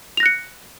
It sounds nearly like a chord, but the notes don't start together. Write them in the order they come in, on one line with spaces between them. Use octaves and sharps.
F7 A#6 F#6 C#7